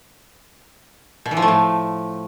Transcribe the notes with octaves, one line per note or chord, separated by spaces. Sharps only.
B2
E3
F3
A3
A2